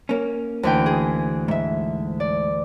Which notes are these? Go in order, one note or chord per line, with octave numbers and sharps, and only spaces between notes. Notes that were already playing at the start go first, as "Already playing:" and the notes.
A#3 C#4
D2 E3 G5
G#4
G#2 E5
D5